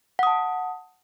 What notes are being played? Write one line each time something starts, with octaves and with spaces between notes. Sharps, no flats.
F#5 A5 D#6